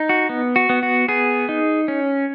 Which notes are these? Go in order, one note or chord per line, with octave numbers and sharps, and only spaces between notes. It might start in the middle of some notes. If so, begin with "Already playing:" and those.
Already playing: D#4
F#4
B3
F#4
B3
F#4
B3 G#4
D#4
C#4